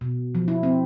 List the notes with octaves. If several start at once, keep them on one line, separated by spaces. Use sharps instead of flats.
B2
F3
E4
C4